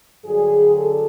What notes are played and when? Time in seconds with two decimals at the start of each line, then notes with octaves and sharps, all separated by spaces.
0.25 G2 D3 F#3 G#4
0.74 A4